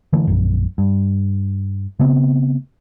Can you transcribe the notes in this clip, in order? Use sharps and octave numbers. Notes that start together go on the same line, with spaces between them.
D3 E3 A3
A#1 F#2
G2
C#3 A3 B3 C4